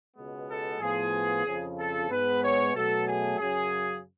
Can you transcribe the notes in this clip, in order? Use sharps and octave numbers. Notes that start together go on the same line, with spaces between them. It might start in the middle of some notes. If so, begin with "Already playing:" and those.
C#2 B2 G#3 B3
A4
A2 F3 B3 G#4
F2 C#3 F3
A4
G#2 G#3 B3 B4
C#5
B2 F#3 A3 A4
G#4
F#2 C#3 F#3 G#4